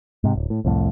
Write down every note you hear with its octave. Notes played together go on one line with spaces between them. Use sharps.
G#2 C3
D1
A2
C2 F2 A2